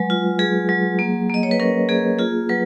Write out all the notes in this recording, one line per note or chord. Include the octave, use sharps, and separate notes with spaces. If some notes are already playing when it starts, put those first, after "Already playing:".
Already playing: F#3 G#3 B4
F4
F#3 G#4
F#3
A#3
A#3 D#5
C#5
B4
C#4 A#4
A#3 G#4
F4 G#4
F#3 B4